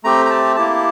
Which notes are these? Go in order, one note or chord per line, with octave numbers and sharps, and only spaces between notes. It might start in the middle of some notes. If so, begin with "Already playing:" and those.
A3 C4 G4 A#5
A#5
A5
A#3 E4 G4 A5